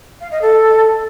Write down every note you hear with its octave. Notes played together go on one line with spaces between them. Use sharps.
F5
D#5
A4